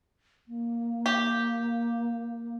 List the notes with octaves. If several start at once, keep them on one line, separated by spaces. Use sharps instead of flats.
A#3
G4